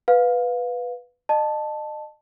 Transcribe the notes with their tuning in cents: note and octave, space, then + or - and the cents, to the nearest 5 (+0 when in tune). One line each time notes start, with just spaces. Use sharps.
B4 +0 F5 +20
D#5 -35 A5 +0